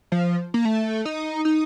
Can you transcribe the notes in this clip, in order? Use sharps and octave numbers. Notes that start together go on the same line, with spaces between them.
F3
A#3
A3
D#4
D#4